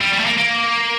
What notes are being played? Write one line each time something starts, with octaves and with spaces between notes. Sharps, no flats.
G3
G3
A3
A#3
A#3